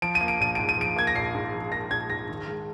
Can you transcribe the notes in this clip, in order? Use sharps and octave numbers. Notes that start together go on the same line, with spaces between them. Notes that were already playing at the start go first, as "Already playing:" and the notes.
F3 D7
D#7
A#3
D7
A#1 D#7
G#2 D7
D#7
F3 D7
A#3 G#6
A#6
A#1 C7
G#2
F3
A#3 A#6
A#1 G#6
G#2 A#6
D#3
G#3